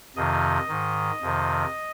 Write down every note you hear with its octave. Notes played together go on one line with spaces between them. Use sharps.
F2 C3 D#3 D#5
G#2 D#3
F2 C3 D#3